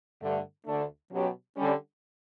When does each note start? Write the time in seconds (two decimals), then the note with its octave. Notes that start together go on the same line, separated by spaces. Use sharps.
0.22 G2 D3 A3
0.66 D2 D3 A3 D4
1.12 B2 F#3 C#4 G4
1.56 D3 G3 C#4